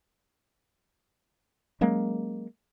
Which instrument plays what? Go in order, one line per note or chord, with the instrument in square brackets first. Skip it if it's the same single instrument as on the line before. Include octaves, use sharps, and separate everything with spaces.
[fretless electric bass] F#3 G#3 A#3 C#4